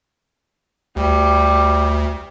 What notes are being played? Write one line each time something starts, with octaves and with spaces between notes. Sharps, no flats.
D2 G3